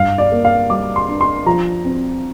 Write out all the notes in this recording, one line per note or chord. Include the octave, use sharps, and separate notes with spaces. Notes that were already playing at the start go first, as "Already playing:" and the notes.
Already playing: G2 F5
D5
A#3
F5
G3 D6
C6
D4
C6
F3 A#5
C4